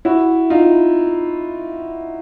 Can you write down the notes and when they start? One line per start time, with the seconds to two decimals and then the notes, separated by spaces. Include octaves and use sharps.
0.05 E4 F#4
0.50 D#4 F4